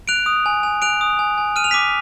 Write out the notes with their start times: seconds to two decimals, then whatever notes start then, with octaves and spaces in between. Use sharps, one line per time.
0.08 F#6 D7 F7
0.26 D#6
0.46 G#5
0.63 G#5
0.82 F#6 D7 F7
1.01 D#6
1.19 G#5
1.38 G#5
1.56 F6 D#7
1.64 F7
1.71 D6 B6 D#7